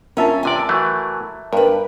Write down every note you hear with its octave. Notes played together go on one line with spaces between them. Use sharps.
C#4 F4 A#4 E5 A5
E2 C3 D5 G#5
E3 F#3 A3
G2 A#4 B4